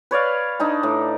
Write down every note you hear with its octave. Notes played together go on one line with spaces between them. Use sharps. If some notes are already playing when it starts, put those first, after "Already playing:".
B4 C#5 D5 F5
D4 D#4 A5
A2